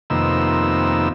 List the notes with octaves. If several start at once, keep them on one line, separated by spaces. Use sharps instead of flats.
F2 C3 D#3 A#3 B3 E6